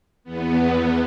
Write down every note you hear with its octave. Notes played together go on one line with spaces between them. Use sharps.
E2 B3